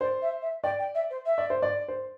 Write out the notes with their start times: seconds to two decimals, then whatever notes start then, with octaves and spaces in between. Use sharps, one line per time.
0.01 C5 D5
0.22 E5
0.42 E5
0.64 D5 G5
0.79 G5
0.95 E5
1.11 C5
1.26 E5
1.38 D5
1.50 C5
1.62 D5
1.88 C5